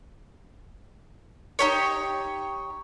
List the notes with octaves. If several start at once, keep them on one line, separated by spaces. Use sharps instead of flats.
D#4 G4 C#5